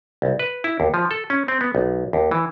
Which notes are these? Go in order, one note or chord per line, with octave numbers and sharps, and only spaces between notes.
C2
B4
E4
D#2
F3
A4
C#4
C4
B3
B1
D#2
E3